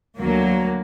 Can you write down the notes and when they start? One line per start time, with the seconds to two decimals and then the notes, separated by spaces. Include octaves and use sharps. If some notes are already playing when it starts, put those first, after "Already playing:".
0.18 D2 F#3 A#3